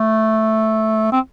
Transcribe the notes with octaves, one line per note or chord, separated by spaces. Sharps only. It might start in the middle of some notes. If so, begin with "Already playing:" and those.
Already playing: A3
C4